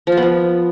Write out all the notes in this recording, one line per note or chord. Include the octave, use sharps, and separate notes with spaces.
F3
F4
B3
F3